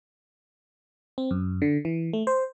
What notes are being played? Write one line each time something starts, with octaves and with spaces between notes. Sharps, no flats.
C4
F#2
D3
E3
A3
C5